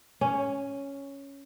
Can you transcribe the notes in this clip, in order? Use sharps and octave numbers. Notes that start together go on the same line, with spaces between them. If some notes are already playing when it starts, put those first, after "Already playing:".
C#4